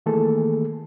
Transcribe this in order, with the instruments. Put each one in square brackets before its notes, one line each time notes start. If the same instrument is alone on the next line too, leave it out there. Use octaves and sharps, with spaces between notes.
[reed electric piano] D#3 E3 A3 A#3 G#4 A4